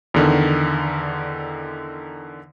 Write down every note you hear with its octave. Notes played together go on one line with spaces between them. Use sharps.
E2 D3 D#3